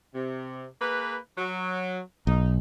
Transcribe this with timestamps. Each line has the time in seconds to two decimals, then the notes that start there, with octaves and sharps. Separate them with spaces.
0.15 C3
0.81 A#3 G#4 B4
1.38 F#3
2.27 B1 D#4